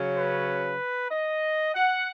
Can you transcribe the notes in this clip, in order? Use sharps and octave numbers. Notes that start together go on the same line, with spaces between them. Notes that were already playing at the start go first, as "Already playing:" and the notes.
Already playing: C#3 F#3 C#4
B4
D#5
F#5